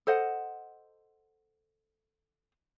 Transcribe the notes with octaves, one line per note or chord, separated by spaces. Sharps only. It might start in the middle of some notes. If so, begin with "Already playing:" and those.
A4 C5 D#5 F#5